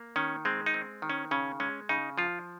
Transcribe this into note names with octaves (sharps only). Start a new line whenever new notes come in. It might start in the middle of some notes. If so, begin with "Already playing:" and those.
Already playing: A#3
D#3 C#4
G#3 C4
D#4
C4
D#3
C#4
C#3 C#4
G#3 C#4
C#3 D#4
F3 F4